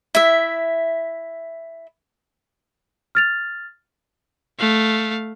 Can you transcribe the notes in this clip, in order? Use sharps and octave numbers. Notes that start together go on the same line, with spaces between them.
E4 E5
F6 A6 F7
A3 F5